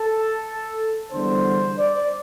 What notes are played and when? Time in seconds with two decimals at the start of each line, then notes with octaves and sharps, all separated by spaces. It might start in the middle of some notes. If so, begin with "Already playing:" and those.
Already playing: A4
1.11 E2 D3 G3 C5
1.78 D5